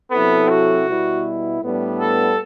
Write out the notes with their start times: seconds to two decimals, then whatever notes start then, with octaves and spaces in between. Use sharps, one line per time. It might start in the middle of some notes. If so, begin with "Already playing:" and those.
0.11 C3 F#3 B3 C4 E4 A4
0.49 F#4
0.87 B2 G3 B3 E4
1.61 A2 G3 B3 D4
1.99 A4